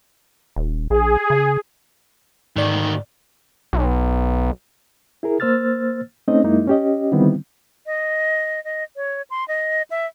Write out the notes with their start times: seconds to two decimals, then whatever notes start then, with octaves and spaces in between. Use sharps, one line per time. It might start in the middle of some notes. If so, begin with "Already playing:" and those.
0.56 D#1
0.90 A#1 G#4
1.30 C#3
2.56 D2 G#2 D#3 D5
3.73 B1
5.23 E4 G#4 A#4
5.40 A#3 C5 E6 F6 A6
6.28 A3 C4 C#4 D#4 D#5
6.44 F#2 G#3 A#3 D#4 E4
6.67 C#4 G4 D#5
7.12 D3 D#3 G3 B3 C4 E4
7.86 D#5
8.64 D#5
8.96 C#5
9.30 C6
9.48 D#5
9.91 E5